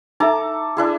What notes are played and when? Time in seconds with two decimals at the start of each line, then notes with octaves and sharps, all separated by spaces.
0.20 D#4 A4 E5 A#5 D6
0.77 D4 E4 G#4